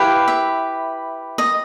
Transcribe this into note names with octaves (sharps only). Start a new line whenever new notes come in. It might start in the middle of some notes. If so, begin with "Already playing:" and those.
Already playing: E4 G4 B4 F5
E5
D#5